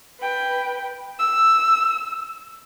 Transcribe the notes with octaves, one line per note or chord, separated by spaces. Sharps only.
B4 G5
E6